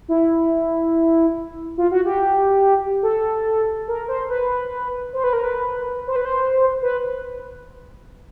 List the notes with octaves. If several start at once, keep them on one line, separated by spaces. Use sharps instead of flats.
E4
F4
F#4
G4
A4
A#4
C5
B4
C5
B4
A#4
B4
C5
B4
C5
B4